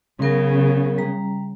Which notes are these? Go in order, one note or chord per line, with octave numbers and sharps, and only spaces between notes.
C#3 F#3 B3 A#4
G3 A#5